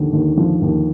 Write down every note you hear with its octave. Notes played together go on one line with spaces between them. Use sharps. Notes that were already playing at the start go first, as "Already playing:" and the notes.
Already playing: D#2 D3 F3
D#2
F3
D#2